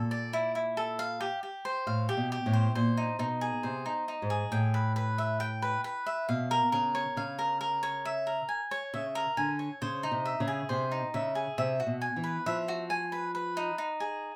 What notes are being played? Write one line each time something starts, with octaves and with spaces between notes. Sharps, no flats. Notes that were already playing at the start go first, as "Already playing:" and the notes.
Already playing: A#2 A4
D5
E4
E4
A4
F5
G4
G4
C5
A2 F5
G4
B2
G4
A2
C5
A#2 C5
D#4
B2 D#4
G#4
C3 C5
D#4
D#4
G#2
G#4
A2 G5
B4
B4
E5
G5
B4
B4
E5
B2 F5
A#4
C#3 A#4
C#5
C#3 F5
A#4
A#4
C#5
E5
A#4
G#5
C#5
C#3 E5
A#4
D3 G#5
C#5
C#3 C5
D#4
C3
E5
C#3
G#4
C3 C5
D#4
C#3 E5
G#4
C3 E5
F#4
B2
G#5
E3
B4
F3 E5
F#4
G#5
B4
B4
D#4
D#4
G#4